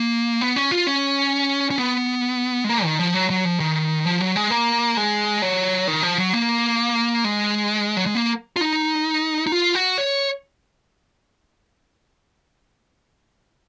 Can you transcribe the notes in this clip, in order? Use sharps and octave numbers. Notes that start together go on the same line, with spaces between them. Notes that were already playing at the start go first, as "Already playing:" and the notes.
Already playing: A#3
B3
C#4
F4
C#4
C#4
B3
G#3
A#3
D#3
F3
F#3
F#3
F3
D#3
F3
F#3
G#3
A#3
G#3
F#3
D#3
F3
F#3
A#3
G#3
F#3
G#3
A#3
F4
D#4
D#4
F4
F#4
C#5